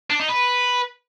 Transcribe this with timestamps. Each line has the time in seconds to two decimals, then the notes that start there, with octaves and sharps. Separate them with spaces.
0.10 D4
0.20 D#4
0.29 B4